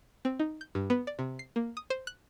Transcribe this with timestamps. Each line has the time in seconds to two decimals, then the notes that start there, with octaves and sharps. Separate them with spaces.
0.25 C4
0.39 D#4
0.61 G6
0.75 G2
0.90 B3
1.07 D5
1.19 C3
1.39 C7
1.56 A#3
1.77 D#6
1.90 C5
2.07 F#6